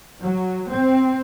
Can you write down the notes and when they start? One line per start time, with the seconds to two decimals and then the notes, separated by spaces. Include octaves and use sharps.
0.22 F#3
0.71 C4